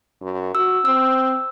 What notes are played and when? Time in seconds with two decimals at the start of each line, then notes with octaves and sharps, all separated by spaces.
0.22 F#2
0.55 F#4 E6
0.85 C4 E6